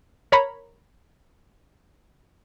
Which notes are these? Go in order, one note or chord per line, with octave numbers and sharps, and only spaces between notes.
A#4 C#5 A#5 B5